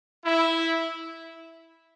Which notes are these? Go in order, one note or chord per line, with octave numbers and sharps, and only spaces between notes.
E4